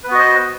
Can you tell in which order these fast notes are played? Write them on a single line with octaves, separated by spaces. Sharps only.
B4 B3 F#4 D#5 C5